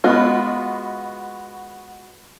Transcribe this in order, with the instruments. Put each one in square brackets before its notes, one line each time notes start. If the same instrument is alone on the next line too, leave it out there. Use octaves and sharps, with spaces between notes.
[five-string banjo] G#3 B3 F4 [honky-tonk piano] F#4 D#5 B5